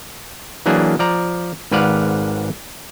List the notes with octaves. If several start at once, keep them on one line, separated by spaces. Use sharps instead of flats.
E3 F#3 A#3 D4 E4 G#4
F3 D5 A#5
G#1 G#2 B4 D5 F5 F#5